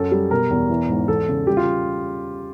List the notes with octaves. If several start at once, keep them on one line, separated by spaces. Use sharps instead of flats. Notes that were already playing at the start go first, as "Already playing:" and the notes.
Already playing: F#2 F#3 A4
G3
B2 A#4
E2
E3
G#2
E2 A4
C#3
G3 G4
F4